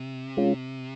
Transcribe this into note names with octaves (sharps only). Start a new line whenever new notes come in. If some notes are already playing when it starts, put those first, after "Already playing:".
Already playing: C3
G#3 C#4 F4